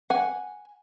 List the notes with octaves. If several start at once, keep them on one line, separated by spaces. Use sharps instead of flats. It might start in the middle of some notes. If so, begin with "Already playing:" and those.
F#5 G#5